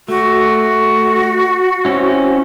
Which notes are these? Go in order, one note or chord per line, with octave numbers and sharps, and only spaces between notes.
A3 F#4
C4 C#4 E4